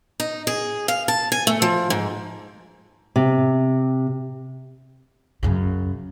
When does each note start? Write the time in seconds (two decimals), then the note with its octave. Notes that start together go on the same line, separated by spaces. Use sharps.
0.20 D#4
0.47 G#4
0.88 F5
1.08 A5
1.32 G#5
1.47 A3
1.62 F3
1.90 G#2
3.16 C3
5.43 F#2 C#3